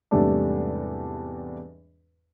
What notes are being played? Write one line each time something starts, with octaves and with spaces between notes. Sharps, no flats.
E2 G#2 C3 G3 A3 D4